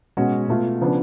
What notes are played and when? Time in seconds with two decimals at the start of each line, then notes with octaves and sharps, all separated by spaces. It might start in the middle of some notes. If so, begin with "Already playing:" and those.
0.17 B2 G#3 C#4 F#4
0.48 B2 A3 F4
0.81 C#3 F3 B3 D4